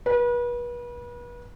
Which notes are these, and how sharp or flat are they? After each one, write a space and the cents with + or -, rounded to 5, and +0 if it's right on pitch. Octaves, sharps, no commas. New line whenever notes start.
B4 -35